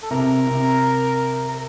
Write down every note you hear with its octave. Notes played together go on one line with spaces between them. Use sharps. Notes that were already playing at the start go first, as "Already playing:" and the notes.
A4
C3 A#4
C3
A#4